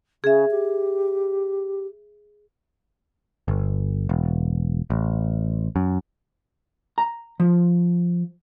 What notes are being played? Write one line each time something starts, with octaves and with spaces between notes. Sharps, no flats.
C#3 G#4 E5
G4
G1
E1
A1
F#2
A#5
F3